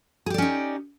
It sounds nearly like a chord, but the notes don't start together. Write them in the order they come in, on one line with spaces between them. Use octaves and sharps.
G#4 G4 D5 C#4 D#4